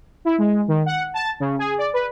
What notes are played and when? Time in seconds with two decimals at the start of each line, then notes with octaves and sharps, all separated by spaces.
0.25 E4
0.38 G#3
0.68 D#3
0.86 F#5
1.14 A5
1.40 C#3
1.58 G#4
1.78 D5
1.93 B4